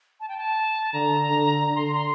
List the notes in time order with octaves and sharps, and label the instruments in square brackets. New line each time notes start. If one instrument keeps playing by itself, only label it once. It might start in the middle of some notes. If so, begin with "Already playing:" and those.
[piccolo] A5
G5
A5
[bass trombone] D3 [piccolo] A#5
[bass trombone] D3
[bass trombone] D3 [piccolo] A#5
[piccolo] C6
A#5
C6